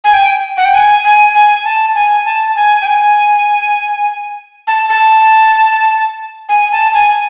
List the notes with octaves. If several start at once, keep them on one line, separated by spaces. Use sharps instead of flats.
G#5
G5
F#5
G5
G#5
G#5
G#5
A5
G#5
A5
G#5
G5
G#5
A5
A5
G#5
A5
G#5